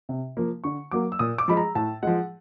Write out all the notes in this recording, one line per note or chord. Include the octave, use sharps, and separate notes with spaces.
C3
F3 A#3
D3 C#6
F#3 A#3 D6
E6
A#2 D#6
D6
F3 G#3 B5
A#5
A2 A5
F3 G#3 F#5